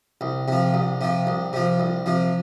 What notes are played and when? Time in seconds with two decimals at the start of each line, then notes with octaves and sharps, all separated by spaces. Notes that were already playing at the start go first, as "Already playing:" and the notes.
0.21 C2
0.48 C3 F3
0.74 C2
1.01 C3 F3
1.27 C2
1.53 C3 F3
1.80 C2
2.06 C3 F3